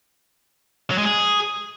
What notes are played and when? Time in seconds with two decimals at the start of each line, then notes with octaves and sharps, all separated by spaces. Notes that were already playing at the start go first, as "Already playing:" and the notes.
0.91 F#3
0.98 G#3
1.05 G#4